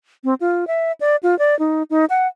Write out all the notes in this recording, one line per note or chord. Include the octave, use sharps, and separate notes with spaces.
C4
F4
E5
D5
F4
D5
D#4
D#4
F#5